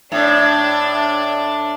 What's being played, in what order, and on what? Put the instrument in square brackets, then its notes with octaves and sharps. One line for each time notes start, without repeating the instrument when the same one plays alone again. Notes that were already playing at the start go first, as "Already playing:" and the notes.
[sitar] A2 [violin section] D4